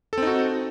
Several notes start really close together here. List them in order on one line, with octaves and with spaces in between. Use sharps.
A4 C4 D#4 F#4